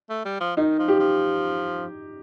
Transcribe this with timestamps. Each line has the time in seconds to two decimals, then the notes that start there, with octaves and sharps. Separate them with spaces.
0.10 A3
0.26 G3
0.41 F3
0.57 D#3 D#4
0.79 F3
0.88 G4
0.99 F3